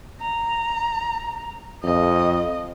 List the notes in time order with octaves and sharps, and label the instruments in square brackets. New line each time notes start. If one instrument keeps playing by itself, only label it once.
[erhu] A#5
[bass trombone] F2 [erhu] D#5